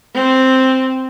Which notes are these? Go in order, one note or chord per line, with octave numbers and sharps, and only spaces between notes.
C4